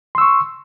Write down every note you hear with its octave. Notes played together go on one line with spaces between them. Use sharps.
C6 C#6 E6